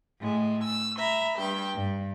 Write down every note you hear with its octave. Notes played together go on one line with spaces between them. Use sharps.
A2 G#3
E6
E5 A#5 B5
G2 G4 G5
G2